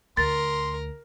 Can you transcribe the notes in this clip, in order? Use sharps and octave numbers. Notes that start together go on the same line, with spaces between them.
D2 A#4 C6 A6